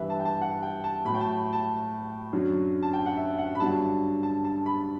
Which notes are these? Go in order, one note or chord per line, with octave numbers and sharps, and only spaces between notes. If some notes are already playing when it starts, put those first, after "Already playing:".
Already playing: G2 E3 B4 E5
A5
G5
A5
F#5
G5
A5
A2 F#3 B5
G5
A5
A5
F#2 D3 F#3
A5
G5
F#5
E5
F#5
B5
G2 D3 F#3 A5
A5
A5
B5